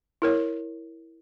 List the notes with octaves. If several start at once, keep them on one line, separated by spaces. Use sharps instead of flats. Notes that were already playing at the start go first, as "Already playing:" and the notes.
E4 A#4 C#5